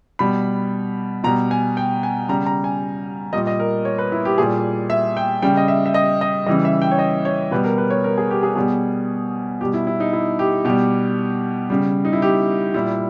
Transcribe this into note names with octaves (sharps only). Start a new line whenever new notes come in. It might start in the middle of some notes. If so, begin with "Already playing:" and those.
B2 G3 B5
B2 G3 A#5
G#5
G5
G#5
C#3 G3 A#5
A#5
G#5
A#2 G3 D#5
D#5
A#4
C#5
B4
E4
G4
A#2 G3 G#4
E5
G5
C#3 G3 G5
D#5
E5
E5
D#5
D#5
C#3 E3 G3 D#5
E5
G5
C#5
D#5
C#5
B2 G3 B4
A#4
B4
C#5
A#4
G#4
G4
G#4
B2 G3 G#4
B2 G3 G4
E4
E4
D#4
E4
G4
B2 G3 G4
C#3 G3
D#4
E4
G4
A#2 G3 E4